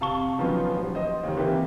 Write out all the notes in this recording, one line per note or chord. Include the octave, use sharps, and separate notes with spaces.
C3 F5 A5 C#6 G7
D#3 F3 F#3 B3 C#4 F4
D#1
C5 D#5
D#2 D#3
C3 E3 A#3 G4